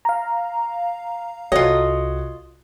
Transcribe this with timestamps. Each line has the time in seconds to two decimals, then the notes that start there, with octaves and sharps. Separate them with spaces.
0.05 F5 A#5
1.52 C2 F4 F#4 A4 C#5 D#5